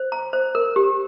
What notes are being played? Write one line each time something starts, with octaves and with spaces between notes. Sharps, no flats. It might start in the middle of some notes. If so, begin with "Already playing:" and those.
Already playing: C5
A#5
C5
A#4
G4